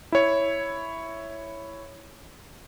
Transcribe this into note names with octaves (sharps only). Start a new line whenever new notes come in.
E4 C#5